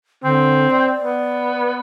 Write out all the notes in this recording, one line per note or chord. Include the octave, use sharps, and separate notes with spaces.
D3 C4
D5
B3